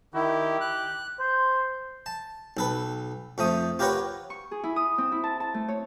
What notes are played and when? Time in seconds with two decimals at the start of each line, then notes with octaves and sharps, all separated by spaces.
0.14 D#3 E4 G4
0.61 F#6
1.19 C5
2.06 A5
2.57 B1 A4 B4
3.38 F2 F3 A3 D#6
3.79 F4 G4 A#4 B4 C#5 F#5
4.30 C#6
4.51 G#4
4.64 E4
4.76 D#6
4.98 C4
5.12 E4
5.24 A5
5.40 A5
5.54 A3
5.68 C#5